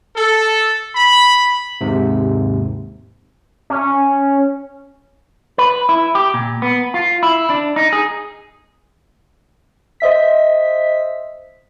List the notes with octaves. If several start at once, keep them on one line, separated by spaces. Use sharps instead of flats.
A4
B5
D#2 G#2 C3
C#4
B4
E4
G4
A#2
B3
F4
E4
D4
D#4
G#4
C5 D#5 E5 B6